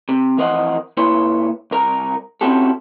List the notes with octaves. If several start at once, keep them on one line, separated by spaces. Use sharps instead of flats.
C3
F2 E3 A#4 C5 D#5 F#5
A#2 E4 B4 C#5 C6
C2 A#4 A#5
C4 C#4 E4 F#4 G4 A4